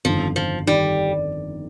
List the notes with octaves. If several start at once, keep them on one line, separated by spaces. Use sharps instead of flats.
G1 F2 D#3 F3
F3
D#3 G3